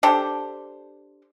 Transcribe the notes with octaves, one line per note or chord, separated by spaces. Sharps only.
D4 G4 A4 C5